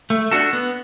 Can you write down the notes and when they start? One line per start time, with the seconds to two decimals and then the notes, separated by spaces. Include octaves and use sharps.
0.10 A3
0.31 D4 F#4 A4
0.53 B3